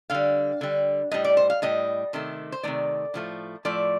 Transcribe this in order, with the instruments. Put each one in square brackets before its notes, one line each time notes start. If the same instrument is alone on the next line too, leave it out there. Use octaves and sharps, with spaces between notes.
[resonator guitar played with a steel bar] D3 G3 F5
D3 G3
A2 G3 D#5
D5
C5
F5
A2 G3 D#5
C3 D#3 A3
C5
C3 D#3 A3 D5
A2 F3 A3
A2 F3 A3 D5